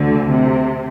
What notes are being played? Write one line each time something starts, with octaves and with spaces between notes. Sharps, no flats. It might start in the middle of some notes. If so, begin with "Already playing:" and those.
Already playing: D2 D3
C3